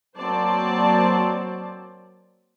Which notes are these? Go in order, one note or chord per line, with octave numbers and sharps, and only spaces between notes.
F#3 A#3 C4 C5 D5 A5